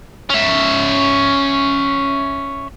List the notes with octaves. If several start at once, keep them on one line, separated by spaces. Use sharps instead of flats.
C#4 E5